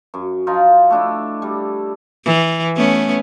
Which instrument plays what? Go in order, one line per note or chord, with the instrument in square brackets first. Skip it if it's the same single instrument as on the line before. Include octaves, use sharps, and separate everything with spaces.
[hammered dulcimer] F#2
F3 D#4 F4
A3 D4 E4
G3
[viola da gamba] E3
A3 B3 C#4